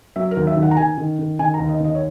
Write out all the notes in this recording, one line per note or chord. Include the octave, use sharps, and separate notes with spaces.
F#3 E5
A#4
D#2
E5
D#3
F#5
A#5
D#3 G#5
D#3
D#3
D#3 G#5
A#5
D#2
D#5
D#2 D#5
C#5